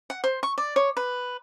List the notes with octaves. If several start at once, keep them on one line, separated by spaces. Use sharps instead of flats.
F#5
C5
C#6
D5
C#5
B4